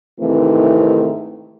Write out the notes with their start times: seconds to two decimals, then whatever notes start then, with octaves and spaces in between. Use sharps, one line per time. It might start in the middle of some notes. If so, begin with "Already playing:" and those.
0.20 G#2 C3 D#3 E3 A3 C4